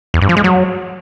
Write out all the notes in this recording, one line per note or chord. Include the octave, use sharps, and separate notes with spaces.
E2
G2
F3
G#3
F#3